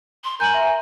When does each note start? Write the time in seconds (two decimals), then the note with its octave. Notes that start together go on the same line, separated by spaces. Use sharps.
0.24 C6
0.40 A#4 G#5 G6 F#7
0.54 E5